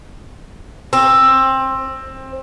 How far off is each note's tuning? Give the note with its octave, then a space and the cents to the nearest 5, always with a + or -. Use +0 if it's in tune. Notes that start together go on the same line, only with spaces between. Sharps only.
C4 +20